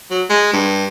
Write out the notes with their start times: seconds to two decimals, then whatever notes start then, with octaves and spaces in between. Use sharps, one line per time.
0.10 F#3
0.29 G#3
0.53 G2